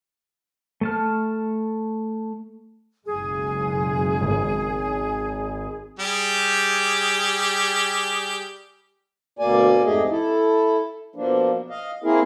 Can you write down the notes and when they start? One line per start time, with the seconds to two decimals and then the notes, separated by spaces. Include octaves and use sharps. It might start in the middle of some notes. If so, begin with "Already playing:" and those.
0.81 A3 A5 F6
3.05 F#1 B1 G#3 G#4
4.21 G#1
5.99 G3 G4 G#4
9.39 D2 B2 A#3 D5 G#5
9.85 F2 G#2 A3 G4 G#4 D#5
10.10 E4 A4
11.16 B2 F3 A#3 D4
11.70 D#5 F5
12.04 A#3 C4 E4 G#4 A#4